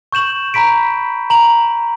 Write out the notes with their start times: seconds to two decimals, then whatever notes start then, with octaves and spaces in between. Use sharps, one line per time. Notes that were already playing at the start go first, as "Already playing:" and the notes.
0.12 C#6 G6 E7 F#7
0.54 A#5 B5 B6 D7
1.30 A#5 D7 F#7